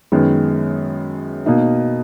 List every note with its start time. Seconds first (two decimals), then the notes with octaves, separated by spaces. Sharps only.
0.12 F#2 D#3 G#3 B3
1.46 B2 A#3 D#4